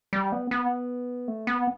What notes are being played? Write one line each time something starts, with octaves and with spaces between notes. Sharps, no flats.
G3
B3
B3
A3
B3